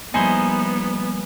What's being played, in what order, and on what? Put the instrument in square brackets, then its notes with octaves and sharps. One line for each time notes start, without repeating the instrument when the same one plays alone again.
[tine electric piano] F3 G3 A#3 [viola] B3 [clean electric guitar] D#4 E4 C5 [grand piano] G#5